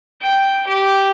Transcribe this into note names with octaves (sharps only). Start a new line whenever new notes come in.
G5
G4